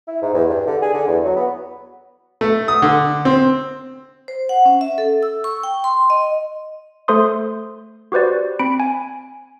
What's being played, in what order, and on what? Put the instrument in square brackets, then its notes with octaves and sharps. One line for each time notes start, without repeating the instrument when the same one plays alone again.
[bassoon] E4
G#2
E2
G2
D3
G#4
D3
E2
F#3
B3
[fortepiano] A3
D#6
D3
C4
[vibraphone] C5
F#5
C#4
E5
A4
E6
C#6
G5
C6
D#5
[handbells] A3 A4 C5 C6 D#6
F#4 G4 B4 C5 D5
C4 B5 D7
G#5